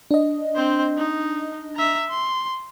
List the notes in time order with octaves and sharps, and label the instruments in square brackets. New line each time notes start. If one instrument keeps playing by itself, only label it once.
[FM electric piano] D4 D#5
[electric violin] C4 C5
D#4
E5 A#5
C6